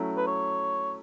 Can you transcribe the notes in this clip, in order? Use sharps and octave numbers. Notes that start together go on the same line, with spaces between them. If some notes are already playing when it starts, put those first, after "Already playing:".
Already playing: F#3 A3 C#4 E4
B4
C#5